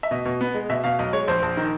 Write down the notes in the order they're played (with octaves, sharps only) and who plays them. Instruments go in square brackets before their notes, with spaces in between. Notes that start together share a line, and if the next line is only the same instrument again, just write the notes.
[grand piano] E5
B2 D#5
B2
B3
G#3
B2 E5
B2 F5
B1 D#5
G#3 C#5
A#1 C5
A#1
D#3